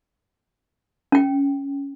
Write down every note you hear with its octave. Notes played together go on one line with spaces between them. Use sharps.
C#4 G5